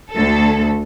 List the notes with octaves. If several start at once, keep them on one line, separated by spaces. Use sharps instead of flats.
D2 A4